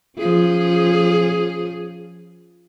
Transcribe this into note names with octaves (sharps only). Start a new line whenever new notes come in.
F3 C#4 G#4